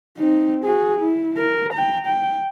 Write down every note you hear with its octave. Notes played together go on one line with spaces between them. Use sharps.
C4 D#4
F#4 G#4
E4
A#4
G5 A#5
G5